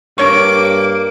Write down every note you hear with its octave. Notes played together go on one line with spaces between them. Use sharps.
G2 A#3 D4 C#5 C#6 D6